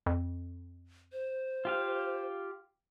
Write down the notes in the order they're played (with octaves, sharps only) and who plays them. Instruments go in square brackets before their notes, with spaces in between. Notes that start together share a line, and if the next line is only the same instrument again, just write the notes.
[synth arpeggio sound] F2
[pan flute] C5
[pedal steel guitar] F4 G4 F5